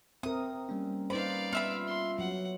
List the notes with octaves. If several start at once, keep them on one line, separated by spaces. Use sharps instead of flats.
C4 A#4 E5 D#6
G3 A#3 C#4
D#4 B4 C5 D5 F5 B5
B3 F4 E5 B5
C6
F#3 F#5